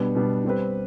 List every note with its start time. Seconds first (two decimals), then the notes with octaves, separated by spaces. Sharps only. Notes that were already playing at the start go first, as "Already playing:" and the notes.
Already playing: B2 G3 B3 D4
0.15 B2 G3 B3 D4
0.45 G3 C4 G4 B4